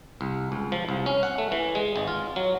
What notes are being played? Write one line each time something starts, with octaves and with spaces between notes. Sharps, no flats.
C2
C#2
F3
C2
C#4
F#5
A3
E3
G#3
G#1
F4
F#3